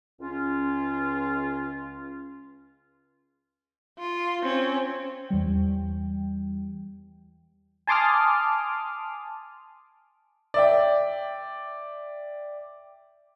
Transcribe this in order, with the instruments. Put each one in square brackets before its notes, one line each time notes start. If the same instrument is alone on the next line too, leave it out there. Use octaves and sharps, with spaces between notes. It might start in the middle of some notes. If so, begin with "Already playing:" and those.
[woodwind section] C#2 C#4 F4
[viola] F4
C4 C#4
[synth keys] E2 E3 G3 G5
[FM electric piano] G#5 A5 C6 D6 D#6 F6
[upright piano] D5 E5 G5